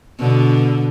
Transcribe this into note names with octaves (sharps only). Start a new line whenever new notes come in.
B2 D3